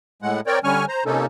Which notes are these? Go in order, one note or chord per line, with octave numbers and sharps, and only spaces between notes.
A2 G#3 F#5
C4 A#4 C#5 D5 G5
D3 G3 C#4 G#5 C#6 F6
C5 A#5
C3 A#3 C#4 D#4 A4